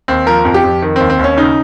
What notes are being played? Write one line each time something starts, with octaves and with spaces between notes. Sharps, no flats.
D#2 C4
F3 A#4
F2
G4
F2
D#3
C4
D#2
C4
D#2
C#4
C#3 D#4